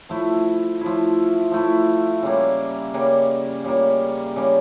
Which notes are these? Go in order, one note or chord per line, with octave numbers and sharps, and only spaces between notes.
F3 A3 E4
F3 A3 E4
F3 A3 E4
C#3 G3 A#3
C#3 G3 A#3
C#3 G3 A#3
C#3 G3 A#3